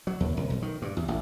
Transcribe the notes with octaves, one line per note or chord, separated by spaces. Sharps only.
F#3
D#2
C2
B1
D#3
G2
E2
A1